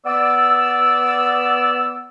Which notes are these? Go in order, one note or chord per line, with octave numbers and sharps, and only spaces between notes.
B3 D5 E6